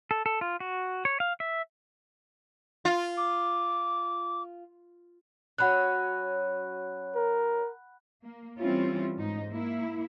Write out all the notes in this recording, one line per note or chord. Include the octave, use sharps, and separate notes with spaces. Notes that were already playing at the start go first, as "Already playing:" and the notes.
A4
A4
F4
F#4
C#5
F5
E5
F4
D6
F#3 C#4 F#5 B5 F#6
A#4
A#3
E3 G3 C4 C#4 E4 F4
G#2 D#4
A#3 E4